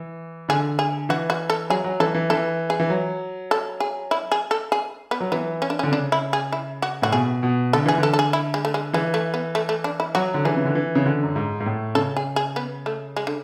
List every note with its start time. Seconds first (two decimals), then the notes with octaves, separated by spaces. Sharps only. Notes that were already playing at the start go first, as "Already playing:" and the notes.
Already playing: E3
0.49 D3 G#4
0.79 G#4
1.09 E3 F#4
1.30 F#4
1.50 A4
1.70 F#3 G#4
1.84 F#3
2.00 E3 A4
2.15 E3
2.30 E3 A4
2.70 G#4
2.80 E3
2.90 F#3
3.51 A4
3.80 G#4
4.11 E4
4.32 G#4
4.51 A4
4.72 G#4
5.11 B3
5.20 F#3
5.32 E3 B3
5.62 C#4
5.70 D4
5.79 C#4
5.83 D3
5.92 C#3 D4
6.12 E4
6.33 G#4
6.53 E4
6.82 F#4
7.02 A2 F#4
7.12 B2 G#4
7.43 B2
7.73 D3 A4
7.86 E3 G#4
7.98 D3
8.03 A4
8.13 A4
8.19 G#4
8.33 E4
8.54 G#3
8.65 A3
8.74 G#3
8.93 E3 G#3
9.14 A3
9.34 B3
9.55 A3
9.69 A3
9.84 D4
10.00 E4
10.15 F#3 F#4
10.34 D3
10.45 E3 G#4
10.57 C#3
10.65 D3
10.75 E3
10.95 C#3
11.06 D3
11.23 F#2
11.36 G#2
11.60 G#2
11.66 A2
11.95 C#3 A4
12.17 G#4
12.36 G#4
12.56 B3
12.86 A3
13.17 G#3
13.27 D3